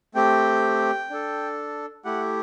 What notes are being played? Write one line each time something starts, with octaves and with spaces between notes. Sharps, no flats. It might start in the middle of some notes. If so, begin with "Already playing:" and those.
A3 C4 G4 G5
D4 A4
A3 E4 G4 F#5